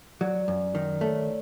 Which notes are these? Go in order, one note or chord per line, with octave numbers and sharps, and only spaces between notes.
F#3 D5
F#2
D#3
A3 C#5